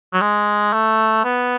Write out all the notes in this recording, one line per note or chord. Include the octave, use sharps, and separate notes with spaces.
F#3
G#3
A3
B3